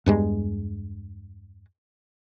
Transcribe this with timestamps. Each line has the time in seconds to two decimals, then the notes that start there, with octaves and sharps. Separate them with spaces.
0.06 E2 G2 G#3